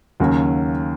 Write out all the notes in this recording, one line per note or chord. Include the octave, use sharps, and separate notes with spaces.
D#2 C#3 F#3 C#4 F#4